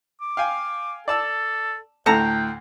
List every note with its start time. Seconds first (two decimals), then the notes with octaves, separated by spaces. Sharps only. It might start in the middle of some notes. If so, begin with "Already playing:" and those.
0.21 D6
0.37 F5 G5 G#5
1.08 A4 D5 A5 E6
2.06 D2 A2 A4 G5 A5 A#5